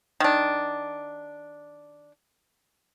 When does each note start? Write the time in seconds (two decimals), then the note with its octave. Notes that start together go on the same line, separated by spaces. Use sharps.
0.20 D#3 D4